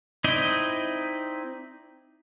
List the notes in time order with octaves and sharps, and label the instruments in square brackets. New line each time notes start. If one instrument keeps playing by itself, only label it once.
[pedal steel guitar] C4 D#4 E4 D5 D#5